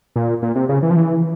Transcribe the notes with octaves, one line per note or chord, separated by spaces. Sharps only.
A#2
A#2
C3
C#3
E3
F3
E3